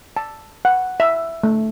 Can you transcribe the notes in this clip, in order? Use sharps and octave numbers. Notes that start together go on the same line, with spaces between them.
A5
F#5
E5
A3